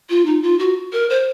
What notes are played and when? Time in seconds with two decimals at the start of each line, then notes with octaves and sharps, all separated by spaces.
0.09 F4
0.25 D#4
0.42 F4
0.59 F#4
0.93 A#4
1.10 C5